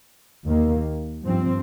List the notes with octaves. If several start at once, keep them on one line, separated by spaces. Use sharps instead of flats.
D#2 D#3 A#3
G2 F3 C4